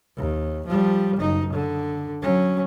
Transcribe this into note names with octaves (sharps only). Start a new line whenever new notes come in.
D#2
F3 G3
F#1 D#4
D3
F#3 C#4